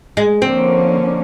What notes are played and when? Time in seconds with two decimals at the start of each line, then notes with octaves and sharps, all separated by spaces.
0.17 G#3
0.42 D3 F3 A#3 C4 C#4